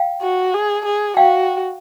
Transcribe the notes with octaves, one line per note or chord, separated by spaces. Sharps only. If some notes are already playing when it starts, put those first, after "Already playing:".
Already playing: F5 G5
F#4
G#4
G#4
F#4 F5 G5